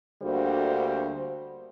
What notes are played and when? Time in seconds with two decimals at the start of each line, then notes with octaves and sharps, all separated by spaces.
0.23 D2 D3 G3 A#3 F#4 C5